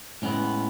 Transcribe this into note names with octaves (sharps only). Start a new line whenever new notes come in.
A2 G#3 B3 C#4